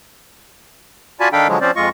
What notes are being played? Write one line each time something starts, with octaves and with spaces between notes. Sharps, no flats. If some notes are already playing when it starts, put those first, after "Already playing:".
F4 F#4 D5 G#5 A5 B5
D#3 D4 A4 F5 G5 B5
D3 F3 F#3 G#3
F3 C4 C#4 C5 D5
F2 G#3 F4 D#5 C#6